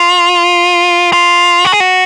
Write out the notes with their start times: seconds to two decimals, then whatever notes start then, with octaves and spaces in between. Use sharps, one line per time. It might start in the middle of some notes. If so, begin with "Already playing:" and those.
Already playing: F4
1.13 F4
1.65 F#4
1.72 G#4
1.80 F#4